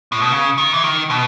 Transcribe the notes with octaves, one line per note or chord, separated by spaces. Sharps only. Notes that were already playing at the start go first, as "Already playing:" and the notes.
A2
B2
C#3
D#3
E3
D#3
B2